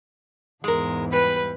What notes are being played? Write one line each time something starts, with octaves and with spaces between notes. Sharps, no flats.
E2 G#2 G#3 A#4
G3 B4